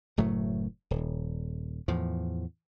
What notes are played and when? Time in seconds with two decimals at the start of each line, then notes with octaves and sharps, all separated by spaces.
0.17 F#1 A2 F#3 A3
0.91 D#1
1.88 E2 A2 F3